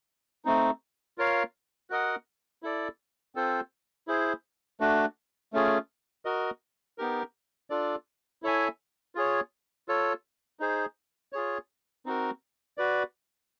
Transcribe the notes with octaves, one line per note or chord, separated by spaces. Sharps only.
A3 C4 D#4
F4 A#4 C#5 F5
F#4 A#4 D#5 F#5
E4 A4 D5
C4 F4 A4 C5
E4 G#4 C5
A3 D4 F#4
A3 C#4 F4 G#4
F#4 A#4 D#5
B3 D#4 G4 A#4
D4 F4 A4 D5
E4 A4 C#5 E5 G#5
F4 G#4 C#5
F4 A4 C#5
D#4 G#4 C5
F4 G#4 C#5
C4 D#4 F#4 A#4
F#4 B4 D5